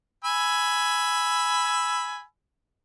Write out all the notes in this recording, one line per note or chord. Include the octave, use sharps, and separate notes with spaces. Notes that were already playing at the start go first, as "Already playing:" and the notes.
G#5 B5 E6